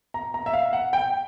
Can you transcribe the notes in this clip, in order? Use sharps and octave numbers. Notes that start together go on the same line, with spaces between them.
A#5
A#5
E5
F5
F#5
G5